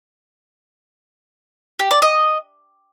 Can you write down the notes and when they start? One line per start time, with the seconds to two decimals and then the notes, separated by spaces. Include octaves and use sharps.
1.79 G4
1.91 D5
2.02 D#5